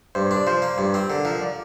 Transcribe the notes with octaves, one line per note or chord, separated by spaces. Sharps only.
G2 C5
C5
D4
D5
F3 C5
A#3
G2
C4
D3 A#4
F3 A#4
D5